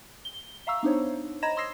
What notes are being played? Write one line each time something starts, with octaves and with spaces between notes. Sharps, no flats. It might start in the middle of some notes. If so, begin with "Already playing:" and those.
G7
E5 F5 A#5 C#6 E6
B3 D4 D#4 C5 C#5
D#5 A#5 B5 G#6 A#6 E7
C6 D#6 E6 A#6 C7